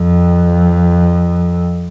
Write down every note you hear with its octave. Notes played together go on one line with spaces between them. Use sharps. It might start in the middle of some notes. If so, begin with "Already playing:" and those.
Already playing: F2